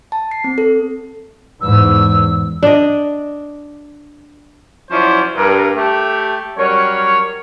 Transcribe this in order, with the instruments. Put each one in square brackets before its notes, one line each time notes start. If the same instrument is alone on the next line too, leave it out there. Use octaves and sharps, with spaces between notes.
[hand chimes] A5
C7
C4
A4
[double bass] E2 G#2 [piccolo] E6
[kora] D4 D#5
[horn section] F3 F#3 C#4 E4 C5 D5
G2 A#4
A3 G4
F#3 G3 C#4 A#4 C#5